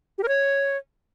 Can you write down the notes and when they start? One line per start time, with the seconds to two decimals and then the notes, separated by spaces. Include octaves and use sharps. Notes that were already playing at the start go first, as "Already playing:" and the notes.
0.18 G4
0.23 A#4
0.28 C#5